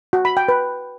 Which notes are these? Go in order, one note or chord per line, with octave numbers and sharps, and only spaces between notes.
F#4
B5
G5
B4